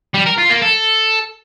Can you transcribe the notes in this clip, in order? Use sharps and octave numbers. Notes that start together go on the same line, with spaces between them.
G3
A#4
F4
A#3
A4